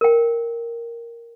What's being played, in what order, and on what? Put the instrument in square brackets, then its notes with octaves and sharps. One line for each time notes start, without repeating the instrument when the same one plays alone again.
[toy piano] A#4 G5